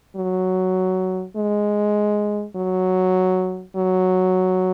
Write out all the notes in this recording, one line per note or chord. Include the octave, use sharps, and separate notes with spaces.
F#3
G#3
F#3
F#3